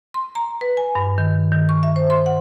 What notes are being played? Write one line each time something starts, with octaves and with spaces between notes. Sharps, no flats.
C6
A#5
B4
G#5
G2
D#3
D#3
C#6
E5
C5
C6
F#5